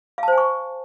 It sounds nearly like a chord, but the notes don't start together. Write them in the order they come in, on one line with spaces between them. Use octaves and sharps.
F5 A5 C5 G#5 C#6